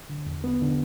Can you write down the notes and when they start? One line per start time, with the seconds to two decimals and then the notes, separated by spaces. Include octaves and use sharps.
0.09 D3
0.26 E2
0.44 B3
0.62 D3